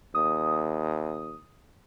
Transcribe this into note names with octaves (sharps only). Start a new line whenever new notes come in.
D#2 D#6